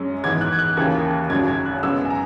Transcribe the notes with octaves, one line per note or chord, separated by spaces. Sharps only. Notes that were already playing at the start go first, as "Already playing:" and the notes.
Already playing: F#2 G#3 C#4
G#2 E3 B3 G#6
F#6
G#6
F#6
D#2 C#3 E3 A#3 G#6
G#1 F#2 C#3 F#3 G#6
G#6
F#6
F#2 C#3 G#3 B3 E6
G#5
A#5